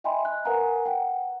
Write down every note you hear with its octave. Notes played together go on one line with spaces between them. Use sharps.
D#5 E5 G5 G#5 B5 C6
F#6
A#4 B4 F5 F#5 G#5 A#5
F#5 G5